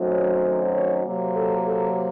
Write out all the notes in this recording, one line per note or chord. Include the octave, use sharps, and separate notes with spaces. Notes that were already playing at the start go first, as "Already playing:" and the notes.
Already playing: F#2 D#3 F#3 A3 C4
C#5
C#5
C3 F#3 A#3
A4
A4